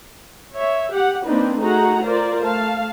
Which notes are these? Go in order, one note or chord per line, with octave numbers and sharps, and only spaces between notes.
C#5 E5
G4 F#5
A#3 C4 D4 D#4 B4
A3 D#4 F#4 G#4 F#5 A#5
F4 A#4 C5 D5
A3 F5 A5